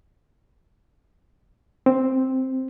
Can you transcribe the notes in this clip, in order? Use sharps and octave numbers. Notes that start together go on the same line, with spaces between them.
C4